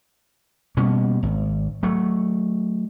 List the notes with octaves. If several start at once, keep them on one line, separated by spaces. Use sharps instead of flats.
B2 G3 A#3 C#4
G#1
F#3 A3